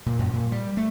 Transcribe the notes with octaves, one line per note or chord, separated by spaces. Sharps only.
A#2
F#2
A#2
G3
A3